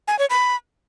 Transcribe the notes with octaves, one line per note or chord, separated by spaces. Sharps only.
G#5
C#5
B5